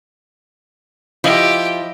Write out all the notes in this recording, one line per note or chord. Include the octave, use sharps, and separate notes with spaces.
F3 E4 G4 D#5 E5